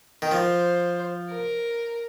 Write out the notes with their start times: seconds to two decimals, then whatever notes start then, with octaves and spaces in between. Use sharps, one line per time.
0.22 D#3
0.31 F3 C5
1.29 A#4